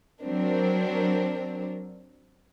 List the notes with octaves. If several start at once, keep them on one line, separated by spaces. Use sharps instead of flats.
F#3 C4 D4 A#4